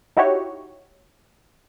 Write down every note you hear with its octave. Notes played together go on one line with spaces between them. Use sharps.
D#4 E4 F#4 G4 C#5